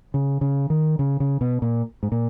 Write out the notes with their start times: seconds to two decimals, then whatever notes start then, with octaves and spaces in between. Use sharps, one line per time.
0.14 C#3
0.41 C#3
0.70 D#3
0.99 C#3
1.20 C#3
1.41 B2
1.62 A#2
2.03 G#2
2.12 A#2